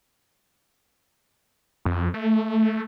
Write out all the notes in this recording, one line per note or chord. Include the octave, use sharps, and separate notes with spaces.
F2
A3